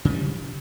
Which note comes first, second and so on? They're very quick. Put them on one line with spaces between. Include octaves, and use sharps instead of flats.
C#3 F3 G3